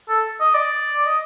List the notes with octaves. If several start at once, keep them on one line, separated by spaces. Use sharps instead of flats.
A4
D#5
D5
D#5